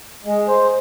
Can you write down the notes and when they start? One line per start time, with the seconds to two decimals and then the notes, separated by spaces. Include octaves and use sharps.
0.24 G#3
0.48 C5